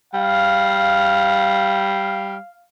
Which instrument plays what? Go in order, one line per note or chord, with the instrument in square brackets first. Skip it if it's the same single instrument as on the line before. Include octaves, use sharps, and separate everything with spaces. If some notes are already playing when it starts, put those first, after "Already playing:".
[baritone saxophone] G3 [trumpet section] F5